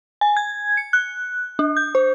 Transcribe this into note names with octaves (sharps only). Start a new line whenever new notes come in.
G#5
G#6
C#7
F#6
D4
G6
C5